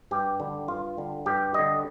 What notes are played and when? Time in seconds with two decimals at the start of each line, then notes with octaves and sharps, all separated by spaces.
0.11 G2 G4
0.40 D3 G3
0.68 G2 F4
0.97 D3 G3
1.26 G2 G4
1.54 D3 G3 D#5